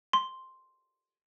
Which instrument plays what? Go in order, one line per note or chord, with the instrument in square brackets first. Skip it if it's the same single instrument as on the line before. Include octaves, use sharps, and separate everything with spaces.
[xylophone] C6